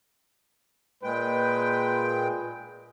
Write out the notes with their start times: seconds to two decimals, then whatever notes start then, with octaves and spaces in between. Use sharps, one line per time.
1.03 A#2 G#3 B4 G5